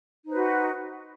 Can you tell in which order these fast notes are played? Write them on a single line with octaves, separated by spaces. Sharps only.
D#4 C5 B4 F#4